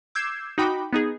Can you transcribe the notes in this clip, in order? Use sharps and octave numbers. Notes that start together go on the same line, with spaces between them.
D6 E6 G6 G#6 C7 E7
D#4 F#4 G5 B5 D6
B3 D#4 G#4